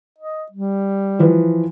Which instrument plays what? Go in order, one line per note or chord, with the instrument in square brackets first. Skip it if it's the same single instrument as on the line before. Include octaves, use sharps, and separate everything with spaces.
[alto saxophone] D#5
G3
[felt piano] E3 F3 B4